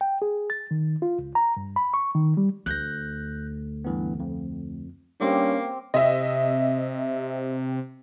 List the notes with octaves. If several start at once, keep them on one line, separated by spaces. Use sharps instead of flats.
G5
G#4
A6
D#3
F4
C#2
A#5
G2
B5
C#6
D#3
G3
D2 F#6 G6 A#6
G2 E3 B3
F2
G2 A#3 C4 C#4 G4
C3 D#5 E5